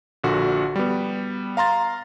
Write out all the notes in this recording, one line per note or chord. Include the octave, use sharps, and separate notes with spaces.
A#1 A#2 D3 F#4
G3 B3
F5 A#5 C6 A6